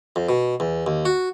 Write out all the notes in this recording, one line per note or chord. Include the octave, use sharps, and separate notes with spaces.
F2
B2
E2
D#2
F#4